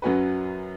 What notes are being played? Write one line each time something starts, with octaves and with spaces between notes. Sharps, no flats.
F#2 F#3 C#4 F#4 B4